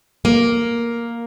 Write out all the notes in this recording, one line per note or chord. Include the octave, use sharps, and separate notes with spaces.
A#3